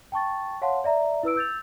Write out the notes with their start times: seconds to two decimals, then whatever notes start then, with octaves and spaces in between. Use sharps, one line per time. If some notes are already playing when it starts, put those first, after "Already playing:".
0.12 G5 A5 C#6 A6
0.62 C#5 F5 F#5 A5 C6
0.84 D5 E5 A#5
1.23 E4 B4 E6 D7
1.36 E6 G6 A6 F7